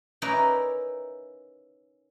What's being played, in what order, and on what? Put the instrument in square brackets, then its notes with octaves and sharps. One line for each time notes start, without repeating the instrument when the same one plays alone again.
[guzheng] C#4 D#4 E4 A#4 B4 D5